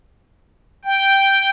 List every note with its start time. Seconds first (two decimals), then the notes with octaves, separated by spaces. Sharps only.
0.85 G5